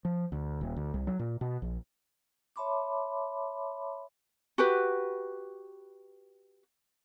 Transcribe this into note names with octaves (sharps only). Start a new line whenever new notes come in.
F3
D2
D#1
D2
C2
F#3
A#2
B2
A#1
C#5 E5 A5 B5 C6 D6
F#4 G4 B4